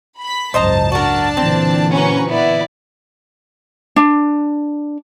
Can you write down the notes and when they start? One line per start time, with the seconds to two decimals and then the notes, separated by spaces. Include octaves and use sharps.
0.20 B5 B6
0.54 F#1 C#2 G#2 C5 D#5 A5 A#5
0.92 D4 F#4 A#4 D5
1.37 A#2 D3 E3 C4
1.92 C#4 F#4 B4 A#5 C#6
2.29 B3 E4 B4 D5
3.96 D4